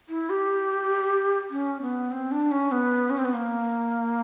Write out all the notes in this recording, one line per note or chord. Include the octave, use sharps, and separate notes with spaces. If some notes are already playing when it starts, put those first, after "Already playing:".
E4
G4
C#4
B3
C4
D4
C#4
B3
C#4
C4
B3
A#3